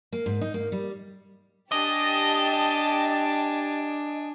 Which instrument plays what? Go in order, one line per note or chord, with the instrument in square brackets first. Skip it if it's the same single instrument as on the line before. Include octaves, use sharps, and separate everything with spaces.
[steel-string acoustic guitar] A#3
G#2
D#4
A#3
G3
[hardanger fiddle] D4 G#5 [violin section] G4 A5 [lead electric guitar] D#5